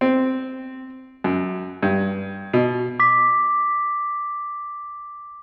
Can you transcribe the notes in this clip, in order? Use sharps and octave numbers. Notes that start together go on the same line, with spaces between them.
C4
F#2
G2
B2
D6 B6